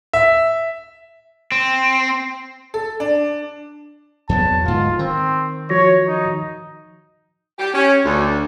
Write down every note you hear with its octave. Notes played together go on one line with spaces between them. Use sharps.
E5
C4
A4
D4
E2 F#3 B3 A5
D1 G#2 F4
D#3 C4
F3 F#4 C#5 A#6
D#4
G4
C#4
D2